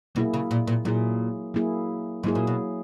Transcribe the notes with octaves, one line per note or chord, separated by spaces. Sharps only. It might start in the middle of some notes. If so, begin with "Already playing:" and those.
B2 F#3 A#3 E4 G#4
C#3
A#2
A#2
A#2 F#3 A#3 E4 G#4
F#3 A#3 E4 G#4
G#2 F#3 A#3 E4 G#4
A#2
B2